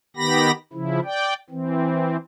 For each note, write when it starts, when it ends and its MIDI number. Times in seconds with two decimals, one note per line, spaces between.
0.17 0.51 51
0.17 0.51 59
0.17 0.51 67
0.17 0.51 83
0.17 0.51 94
0.73 1.00 49
0.73 1.00 53
0.73 1.00 64
1.04 1.34 74
1.04 1.34 79
1.50 2.17 52
1.50 2.17 60